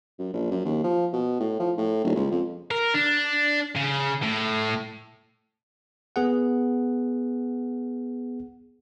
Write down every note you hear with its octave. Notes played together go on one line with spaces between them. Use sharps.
F#2
A#1
F#2
D#2
F3
B2
A2
F3
A2
D#1
C#2
F2
A#4
D4
C#3
A2
B3 G#4 F#5